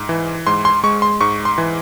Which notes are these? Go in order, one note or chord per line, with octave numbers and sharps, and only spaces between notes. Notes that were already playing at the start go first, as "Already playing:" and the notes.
Already playing: G#2
E3
G#2 C6
C6
G#3 C#6
C6
G#2 C#6
C6
E3